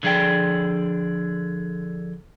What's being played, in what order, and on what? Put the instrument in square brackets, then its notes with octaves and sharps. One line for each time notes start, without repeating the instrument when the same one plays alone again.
[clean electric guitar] D3 F3 G#4 D5 G5